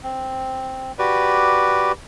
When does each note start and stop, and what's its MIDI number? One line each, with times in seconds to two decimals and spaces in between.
0.03 0.92 60
0.99 1.92 66
0.99 1.92 67
0.99 1.92 71
0.99 1.92 74